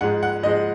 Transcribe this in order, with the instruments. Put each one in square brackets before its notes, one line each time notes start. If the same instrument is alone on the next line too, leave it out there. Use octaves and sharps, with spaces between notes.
[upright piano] G#2 F3 G#3 F#5
F#5
G#2 F3 G#3 D#5